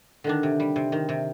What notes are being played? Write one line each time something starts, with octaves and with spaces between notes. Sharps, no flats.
D3 D#3 D4
C3
G3
C3
D#3
C3